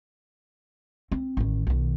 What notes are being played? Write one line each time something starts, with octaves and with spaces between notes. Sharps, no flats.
C4
A1 D#3
B1 D#3